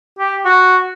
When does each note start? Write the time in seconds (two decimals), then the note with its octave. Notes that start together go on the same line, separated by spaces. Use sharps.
0.19 G4
0.45 F#4